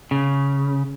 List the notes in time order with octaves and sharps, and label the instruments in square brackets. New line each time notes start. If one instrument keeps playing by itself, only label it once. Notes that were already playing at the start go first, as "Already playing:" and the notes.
[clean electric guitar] C#3